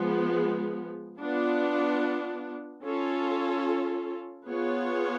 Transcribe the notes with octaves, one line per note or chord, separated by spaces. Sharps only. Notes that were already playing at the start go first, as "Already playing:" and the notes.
Already playing: F3 G#3 B3
B3 D4 F4
C#4 F4 A4
B3 F4 G#4 C#5